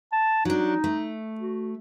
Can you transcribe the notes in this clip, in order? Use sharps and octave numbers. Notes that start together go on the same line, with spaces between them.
A5
F#3 D4 D#4
A3
F#4